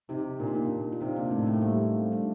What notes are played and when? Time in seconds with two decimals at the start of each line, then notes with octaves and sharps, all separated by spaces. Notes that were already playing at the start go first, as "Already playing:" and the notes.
0.09 C3 D#4 G4
0.39 A#2 D4
0.47 D#4
0.54 A#3 D4
0.92 F4
1.01 C3 C4 D#4
1.16 A#3 D4
1.31 A2 A3 C4
1.46 A3 C4
1.62 G3 A#3
2.12 D4